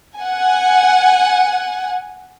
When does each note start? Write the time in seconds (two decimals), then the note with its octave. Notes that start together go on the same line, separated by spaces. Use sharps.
0.18 F#5 G#5